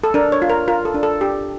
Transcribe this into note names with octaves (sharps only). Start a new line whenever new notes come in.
A4
D4 A#4
C#5
F4
A#4
F4 A#4
A4
D4
A4
D4 G4